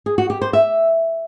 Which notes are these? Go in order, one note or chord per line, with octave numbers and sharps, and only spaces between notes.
G#4
F#4
G4
C5
E5